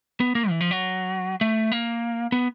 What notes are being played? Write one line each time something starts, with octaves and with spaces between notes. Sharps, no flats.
B3
A#3
E3
F3
F#3
A3
A#3
B3